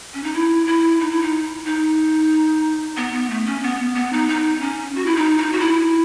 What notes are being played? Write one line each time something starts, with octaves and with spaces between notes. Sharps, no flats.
C#4
D#4
E4
E4
D#4
E4
D#4
D#4
B3
B3
A3
C#4
B3
B3
D#4
D#4
C#4
F#4
E4
D#4
D#4
F#4
E4